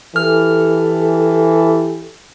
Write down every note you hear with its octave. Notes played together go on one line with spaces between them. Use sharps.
E3 G4 A4 F6